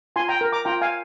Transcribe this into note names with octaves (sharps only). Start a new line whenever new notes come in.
F4 G#5 C6
G5 A#5
A#4
A#5 D6
F4 G5 A#5
F5 G#5